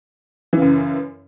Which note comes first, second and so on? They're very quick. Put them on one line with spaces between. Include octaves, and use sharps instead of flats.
E3 C#3 F#2